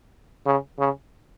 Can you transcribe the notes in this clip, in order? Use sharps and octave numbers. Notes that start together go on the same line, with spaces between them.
C#3
C#3